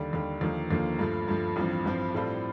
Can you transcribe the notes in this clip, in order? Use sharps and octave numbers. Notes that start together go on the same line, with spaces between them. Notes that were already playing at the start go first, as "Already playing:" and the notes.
Already playing: D#2 D3 G3
D#2 D3 G3
D#2 D3 F3 A#3
D#2 D3 F3 A#3
G2 F3 A3
G2 F3 A3
A1 G2 F3 C4
A1 G2 F3 C4
A2 G3 C4 F4 A4